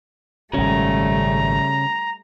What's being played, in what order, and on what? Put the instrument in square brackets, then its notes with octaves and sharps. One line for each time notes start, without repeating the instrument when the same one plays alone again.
[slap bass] G#1 A#2 [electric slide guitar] C#3 C#4 [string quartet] G3 A3 [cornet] A#5